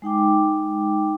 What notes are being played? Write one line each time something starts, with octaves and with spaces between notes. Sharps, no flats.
G#3 D#4 G5 D6